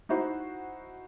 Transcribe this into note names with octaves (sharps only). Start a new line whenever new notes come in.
D#4 E4 F#4 C5